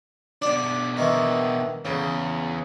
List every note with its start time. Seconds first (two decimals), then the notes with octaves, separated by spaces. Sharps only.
0.42 B2 D4 D5
0.97 D#3 E3
1.85 E2 C#3